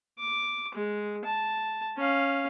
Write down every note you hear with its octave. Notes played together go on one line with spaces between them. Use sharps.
D6
G#3
A5
C#4 F5